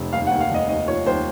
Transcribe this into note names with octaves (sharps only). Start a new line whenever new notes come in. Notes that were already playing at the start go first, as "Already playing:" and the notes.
Already playing: F1
D#2 F5
F#5
D#2
F5
F1 D#5
D#2 D#5
F3 C#5
D#2 C5